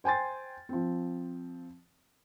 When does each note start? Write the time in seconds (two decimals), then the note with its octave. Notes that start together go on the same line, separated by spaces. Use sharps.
0.04 C5 G5 G#5 C6 A6
0.69 F3 C4